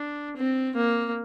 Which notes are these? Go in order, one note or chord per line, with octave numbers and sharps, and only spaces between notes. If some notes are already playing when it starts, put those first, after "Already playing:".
Already playing: D4
C4
A#3